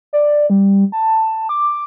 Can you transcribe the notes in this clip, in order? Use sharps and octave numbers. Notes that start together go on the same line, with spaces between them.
D5
G3
A5
D6